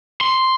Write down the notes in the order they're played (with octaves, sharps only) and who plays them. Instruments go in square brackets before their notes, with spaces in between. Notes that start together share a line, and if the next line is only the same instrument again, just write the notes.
[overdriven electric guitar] C6